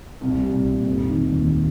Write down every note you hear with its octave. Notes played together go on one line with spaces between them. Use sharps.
C2
G3
C2
A#2
F1
D#3
F1
D#2